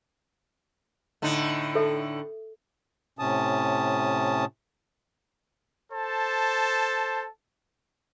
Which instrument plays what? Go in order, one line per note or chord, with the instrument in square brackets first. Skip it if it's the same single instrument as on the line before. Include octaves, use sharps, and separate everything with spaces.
[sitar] A2 D3 D#4
[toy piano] A4 E5
[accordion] A2 C3 C#4 A5 D#6
[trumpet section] A4 C5 A5